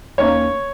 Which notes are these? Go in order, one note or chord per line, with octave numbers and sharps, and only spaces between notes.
D#2 D#3 A#3 C#4 C#5